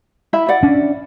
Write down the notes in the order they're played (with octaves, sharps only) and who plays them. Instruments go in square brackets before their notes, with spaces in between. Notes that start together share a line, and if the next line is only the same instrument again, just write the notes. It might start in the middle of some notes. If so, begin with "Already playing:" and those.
[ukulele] E4 E5 B5
D5 F#5
[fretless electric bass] C#4 D4